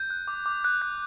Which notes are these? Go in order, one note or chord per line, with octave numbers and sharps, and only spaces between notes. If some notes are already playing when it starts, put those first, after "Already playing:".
Already playing: G6
F#6
D6
D6
F#6
F#6